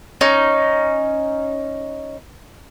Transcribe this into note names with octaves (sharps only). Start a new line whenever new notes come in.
C#4 D#4